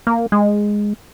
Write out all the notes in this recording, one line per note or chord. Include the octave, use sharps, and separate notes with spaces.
A#3
G#3